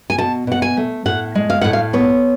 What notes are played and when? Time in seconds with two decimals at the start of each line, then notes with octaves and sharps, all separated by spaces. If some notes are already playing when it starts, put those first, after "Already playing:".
0.10 G#5
0.18 B2 A5
0.47 B2 F#5
0.62 G#5
0.77 A3
1.06 A2 F#5
1.35 G#3
1.50 F5
1.61 A2 F#5
1.73 F5
1.93 B3 C#5